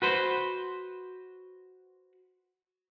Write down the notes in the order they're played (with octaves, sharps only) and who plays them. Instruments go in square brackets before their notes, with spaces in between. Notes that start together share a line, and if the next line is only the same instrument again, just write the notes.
[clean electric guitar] F#4 B4 C5